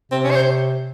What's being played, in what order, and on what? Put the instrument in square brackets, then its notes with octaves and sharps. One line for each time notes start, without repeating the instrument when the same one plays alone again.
[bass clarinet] C3 [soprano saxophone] C4
[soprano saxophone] C#4
C#5
C5